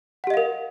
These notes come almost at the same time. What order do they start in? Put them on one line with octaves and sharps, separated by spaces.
F#5 G4 D#5 F5 A#4